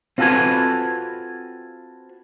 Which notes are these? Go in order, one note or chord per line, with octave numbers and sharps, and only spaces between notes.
C4 F4 F#4 A4 B4 G#5